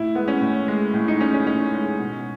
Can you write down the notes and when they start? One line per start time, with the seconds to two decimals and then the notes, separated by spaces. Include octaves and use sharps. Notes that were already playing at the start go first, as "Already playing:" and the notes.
Already playing: A2 E4
0.15 G#3 B3
0.28 C#4
0.41 A2
0.68 G#3
0.94 A2
1.08 D#4
1.20 G#3 C#4
1.34 C#4
1.47 A2 C#4
1.73 G#3
1.99 B2